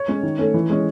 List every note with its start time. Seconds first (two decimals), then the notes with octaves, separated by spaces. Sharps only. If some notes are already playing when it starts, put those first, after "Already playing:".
Already playing: C#5
0.08 G#3 C#4
0.23 D#3
0.39 A3 C#4
0.54 E3
0.70 G#3 C#4